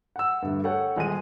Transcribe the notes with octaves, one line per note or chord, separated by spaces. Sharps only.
F#5 E6
G2 D3 A3
A4 C#5 F#5 G5
D#1 G#3 G#4 D#7